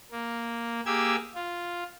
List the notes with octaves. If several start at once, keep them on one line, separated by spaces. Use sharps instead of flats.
A#3
A#3 G4 G#4 E6 G#6
F4